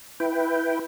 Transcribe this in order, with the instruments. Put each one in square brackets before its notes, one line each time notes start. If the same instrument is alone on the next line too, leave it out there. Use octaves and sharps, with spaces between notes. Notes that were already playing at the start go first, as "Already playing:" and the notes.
[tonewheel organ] E4 B4 G5